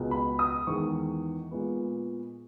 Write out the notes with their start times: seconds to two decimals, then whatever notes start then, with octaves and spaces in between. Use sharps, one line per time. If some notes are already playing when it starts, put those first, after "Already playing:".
Already playing: C#2 B2 G#3 B3
0.11 B5
0.39 D#6
0.67 E2 D#3 G#3 C#6
1.51 A#2 G#3 B3